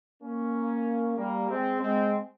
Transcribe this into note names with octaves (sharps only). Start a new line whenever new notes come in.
A#3 C#4
G3 A#3
G#3 C4
G#3 C4